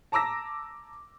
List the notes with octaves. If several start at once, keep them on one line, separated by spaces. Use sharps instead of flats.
A5 A#5 D6 E6 A#6